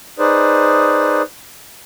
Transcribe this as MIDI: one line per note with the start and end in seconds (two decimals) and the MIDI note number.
0.19 1.22 63
0.19 1.22 68
0.19 1.22 71
0.19 1.22 72
0.19 1.22 74